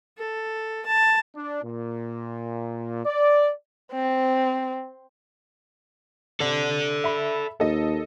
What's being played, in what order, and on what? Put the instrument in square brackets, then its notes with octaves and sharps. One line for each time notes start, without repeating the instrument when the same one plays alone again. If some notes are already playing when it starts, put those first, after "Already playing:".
[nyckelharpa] A4
A5
[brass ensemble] D4
A#2
D5
[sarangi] C4
[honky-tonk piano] C3 [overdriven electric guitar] A4 D5
[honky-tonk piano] E5 B5
[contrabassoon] D#2 [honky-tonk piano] A4 D#5